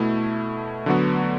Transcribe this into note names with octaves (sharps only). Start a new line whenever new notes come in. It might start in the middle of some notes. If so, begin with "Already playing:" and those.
Already playing: B2 A3 E4
D3 F#3 B3 F#4